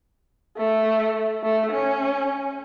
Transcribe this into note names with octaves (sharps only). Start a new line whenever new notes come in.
A3
A3
C#4